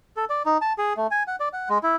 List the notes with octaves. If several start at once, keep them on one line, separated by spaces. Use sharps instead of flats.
A4
D5
D#4
A5
G#4
A3
G#5
F#5
D5
F#5
G#3
E4